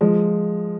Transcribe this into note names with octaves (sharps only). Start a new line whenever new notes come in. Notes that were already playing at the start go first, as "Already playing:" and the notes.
F3 G#3